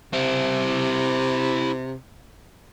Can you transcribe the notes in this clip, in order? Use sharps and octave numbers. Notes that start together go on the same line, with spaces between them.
C3 E4 C5